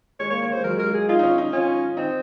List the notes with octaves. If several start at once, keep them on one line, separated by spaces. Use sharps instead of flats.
G#3 C#5
A#3 C#5
A#3 C#5
G#3 C5
F#3 A#4
G#3
A#4
G#3
G#4
D#4 F4
D#4
C#4
D#4
C#4 F4
C4 D#4